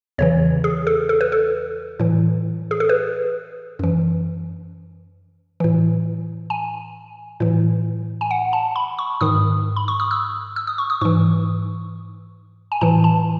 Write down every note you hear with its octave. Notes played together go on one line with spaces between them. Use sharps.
E2 C#3 E3 C#5
G#4
A4
A4
B4
A4
A2 E3
G#4
A4
B4
F#2 E3
A2 E3
G#5
A2 E3
G#5
F#5
A5
B5
C#6
G#2 D#3 D#6
B5
C#6
D#6
E6
E6
D#6
C#6
D#6
G#2 E3 C#6
G#5
A2 E3 A5
A5